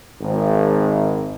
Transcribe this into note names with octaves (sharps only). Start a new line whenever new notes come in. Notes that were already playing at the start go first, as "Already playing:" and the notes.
G#1